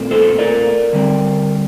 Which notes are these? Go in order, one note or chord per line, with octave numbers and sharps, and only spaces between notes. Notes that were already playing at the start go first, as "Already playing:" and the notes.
Already playing: A#2 A3 C4
A4 C5
A#4 D5
D3 G3 C4